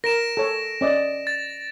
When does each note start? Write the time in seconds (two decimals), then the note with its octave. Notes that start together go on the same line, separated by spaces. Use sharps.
0.04 A#4 A#6 D7 E7
0.37 A4 C#5
0.81 C#4 D5 D#5
1.27 A6